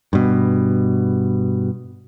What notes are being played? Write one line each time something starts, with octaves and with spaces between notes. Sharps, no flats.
G2 B2